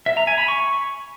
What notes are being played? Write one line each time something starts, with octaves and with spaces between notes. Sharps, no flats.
E5
A#5
G#5
B5
C#6